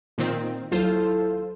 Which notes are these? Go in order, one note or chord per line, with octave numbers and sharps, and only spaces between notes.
A#2 D#3 C4
D#2 F#3 E4 F4 A4 C5